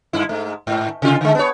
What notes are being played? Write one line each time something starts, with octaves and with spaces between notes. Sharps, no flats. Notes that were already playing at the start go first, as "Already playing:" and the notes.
G2 E4
G#2 A3
G#2
C3 F4
D3 G#3
B3 C#5